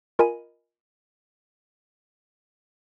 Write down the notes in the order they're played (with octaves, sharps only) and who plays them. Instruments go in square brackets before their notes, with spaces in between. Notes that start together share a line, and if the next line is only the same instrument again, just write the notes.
[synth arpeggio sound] F4 A#4 D#5 G#5 B5 D#7